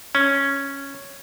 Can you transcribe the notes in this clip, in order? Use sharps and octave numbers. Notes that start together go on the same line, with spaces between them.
C#4